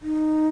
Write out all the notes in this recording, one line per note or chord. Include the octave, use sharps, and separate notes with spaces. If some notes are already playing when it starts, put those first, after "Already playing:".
D#4